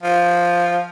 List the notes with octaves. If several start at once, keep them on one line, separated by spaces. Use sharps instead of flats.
F3